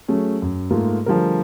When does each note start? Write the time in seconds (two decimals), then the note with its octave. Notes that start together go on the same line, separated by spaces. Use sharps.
0.08 F#3 A3 C#4 G#4
0.42 F#2
0.71 G#2 A3 A#3 F4
1.06 D3 F3 G3 A3 G#4 A#4